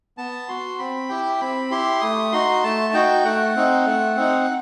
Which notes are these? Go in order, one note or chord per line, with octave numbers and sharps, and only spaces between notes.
B3 A5
F#4 C6
C4 B5
E4 G4 G5
C4 B5
E4 G4 C6
A3 D#6
D#4 F#4 C6
A3 A5
D#4 F#4 G5
A3 F#5
C4 D#4
A3
C4 D#4